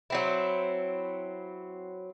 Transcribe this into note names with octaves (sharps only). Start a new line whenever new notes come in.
F#3 C4 E4